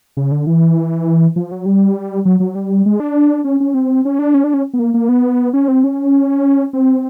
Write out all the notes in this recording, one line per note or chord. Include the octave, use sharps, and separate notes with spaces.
C#3
D3
E3
F3
F#3
G3
F#3
F#3
G3
G#3
D4
C#4
C#4
C4
C#4
D4
C#4
D4
C#4
B3
A#3
A#3
B3
C#4
C4
C#4
C4